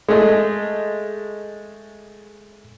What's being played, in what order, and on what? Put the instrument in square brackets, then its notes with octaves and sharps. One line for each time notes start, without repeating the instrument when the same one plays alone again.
[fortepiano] G#3 A3